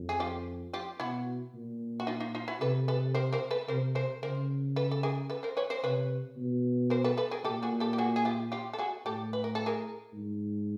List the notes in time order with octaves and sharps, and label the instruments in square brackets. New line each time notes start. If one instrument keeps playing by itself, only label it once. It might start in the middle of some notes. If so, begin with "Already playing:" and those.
Already playing: [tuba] F2
[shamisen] G#4
F4 G4
F4 G4
[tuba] B2 [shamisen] E4 F#4
[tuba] A#2
[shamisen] F#4
D#4 F4
D#4 F4
D#4 F4
E4 F#4
[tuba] C3 [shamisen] A4 B4
[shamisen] A4 B4
A#4 C5
A#4 C5
A4 B4
[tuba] C3 [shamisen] A#4 C5
[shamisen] A#4 C5
[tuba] C#3 [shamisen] A#4 C5
[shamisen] A4 B4
A4
G#4 A#4
A4 B4
A#4 C5
B4 C#5
A#4 C5
[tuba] C3 [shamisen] B4 C#5
[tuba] B2
[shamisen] A#4 C5
A4 B4
A4 B4
G#4 A#4
[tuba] A#2 [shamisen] G4 A4
[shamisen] F#4 G#4
G4 A4
G4
F#4 G#4
G#4
F4 G4
F4 G4
A4
F#4 G#4
[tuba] A2 [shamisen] G4 A4
[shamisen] B4
A#4
A4
G#4 A#4
[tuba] G#2